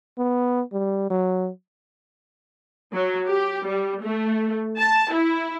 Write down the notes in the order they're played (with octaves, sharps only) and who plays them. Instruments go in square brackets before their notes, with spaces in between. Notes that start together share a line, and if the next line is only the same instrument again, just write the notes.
[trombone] B3
G3
F#3
[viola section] F#3
G4
G3
A3
A5
E4